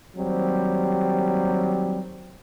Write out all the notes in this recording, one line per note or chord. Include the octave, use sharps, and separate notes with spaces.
D#2 F#3 G3 C4